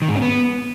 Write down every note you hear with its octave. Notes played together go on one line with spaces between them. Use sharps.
D#3
G#2
C#4
B3